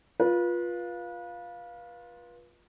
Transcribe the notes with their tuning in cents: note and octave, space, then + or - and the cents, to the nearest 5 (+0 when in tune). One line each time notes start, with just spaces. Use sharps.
F4 +5 B4 -30